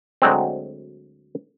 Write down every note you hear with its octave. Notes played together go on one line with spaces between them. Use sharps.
D2 F#3 G#3 C4